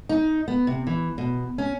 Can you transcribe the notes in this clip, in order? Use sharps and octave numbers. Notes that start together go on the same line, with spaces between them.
D#4
B3
C3
E3
B2
C#4